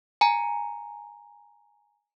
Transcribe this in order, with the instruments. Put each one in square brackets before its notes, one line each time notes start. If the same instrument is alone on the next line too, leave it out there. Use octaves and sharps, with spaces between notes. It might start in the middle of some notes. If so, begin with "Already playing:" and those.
[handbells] G#5 A#5